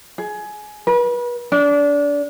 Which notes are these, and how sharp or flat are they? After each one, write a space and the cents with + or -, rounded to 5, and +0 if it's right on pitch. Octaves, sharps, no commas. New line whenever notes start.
G#4 +20
B4 -35
D4 -25